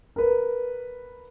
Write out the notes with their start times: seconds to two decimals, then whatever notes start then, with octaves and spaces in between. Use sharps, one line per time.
0.16 A#4 B4